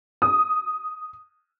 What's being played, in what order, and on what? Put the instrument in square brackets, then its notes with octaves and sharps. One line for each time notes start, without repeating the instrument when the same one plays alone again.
[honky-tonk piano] D#6